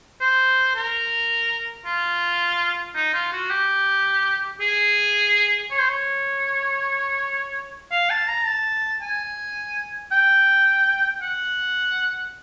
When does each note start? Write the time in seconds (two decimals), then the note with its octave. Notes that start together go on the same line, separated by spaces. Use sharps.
0.21 C5
0.75 A#4
1.85 F4
2.95 D#4
3.14 F4
3.33 F#4
3.50 G4
4.61 G#4
5.71 C#5
5.80 C5
5.89 C#5
7.91 F5
8.10 A5
8.28 A#5
8.46 A5
9.02 G#5
10.12 G5
11.22 F#5